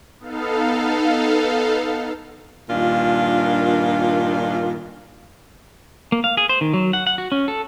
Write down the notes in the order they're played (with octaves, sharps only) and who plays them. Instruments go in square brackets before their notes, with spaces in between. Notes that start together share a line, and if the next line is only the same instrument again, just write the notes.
[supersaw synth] B3 D#4 A4 F5
[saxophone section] G2 A#2 D#3 D4 F4
[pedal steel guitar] A#3
F5
G#4
C5
D#3
F#3
F#5
F#5
F#4
C#4
A4